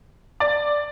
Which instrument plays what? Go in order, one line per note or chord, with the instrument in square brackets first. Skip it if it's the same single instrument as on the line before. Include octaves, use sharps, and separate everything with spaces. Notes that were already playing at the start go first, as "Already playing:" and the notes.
[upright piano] D5